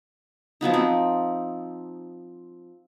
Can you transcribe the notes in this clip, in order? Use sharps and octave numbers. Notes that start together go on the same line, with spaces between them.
F3 F#3 B3 D#4
C4